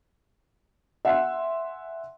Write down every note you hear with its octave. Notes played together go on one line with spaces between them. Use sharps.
E5 F#5 G#5 C6